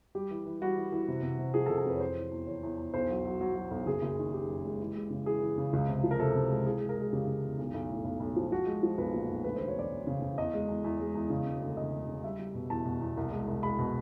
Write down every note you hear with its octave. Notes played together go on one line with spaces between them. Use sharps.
G3 G4
E3
E3
G3 F#4
E3
E3
C3
C3
C3
F3 G#4
A4
C3
A4
F2 B4
C#5
E3 C5
E3
E2
E3 C#5
E2
E2
B1 C5
F#3
F#3
F#3
F#3
B1
F#1 G#4
F#1
D#3
D#3 G4
F#2
G#3
E3
G#3
C#3
E3 G#4
E3
C#3
C#2
C3
F3
A#4
C3 A4
C3
G#3
E3 G#4
G#3
A#4
G#3 G#4
C#3 G4
C#3
E2
B1
B1
A2
B1
B1
F3
F3 F#4
G#3
F3
B1 B4
A#2
B1
D2 B4
E1 C5
C#5
E1 D5
E1
C#3
C#3
E2 D#5
G#3
E2
E2
G#3
E2
C#3
E1
D2
C#3 D#5
E1
C#3
G3 E5
G3
B2
E2 A5
B2
E2
C2
G#3
C2
G#3 B5
B2